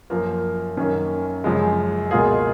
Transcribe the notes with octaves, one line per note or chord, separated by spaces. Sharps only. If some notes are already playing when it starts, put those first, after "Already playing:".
F#2 F3 A#3
F#2 D#3 A#3 C#4
F#2 C#3 F3 G#3
C#2 B2 A#3 F4 G#4